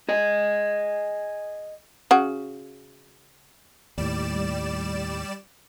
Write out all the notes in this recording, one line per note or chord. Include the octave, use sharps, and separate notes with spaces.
G#4 D#5
C#3 F#4
D#2 A2 G3 D5 E7